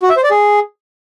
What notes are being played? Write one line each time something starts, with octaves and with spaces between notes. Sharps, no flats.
F#4
E5
C5
D5
G#4